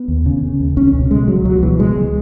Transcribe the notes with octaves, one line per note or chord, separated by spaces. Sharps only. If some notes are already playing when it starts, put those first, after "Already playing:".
Already playing: B3
D#2
C#3
C#3
D#2
C#2 C#4
B2
B2 G#3
C#2 F#3
C#2 F#3
B2 E3
B2 G#3
C#2